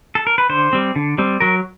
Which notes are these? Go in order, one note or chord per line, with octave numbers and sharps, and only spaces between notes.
A4
A#4
B4
D3 C5
G3 C4
D3
G3 C4
F#3 A#4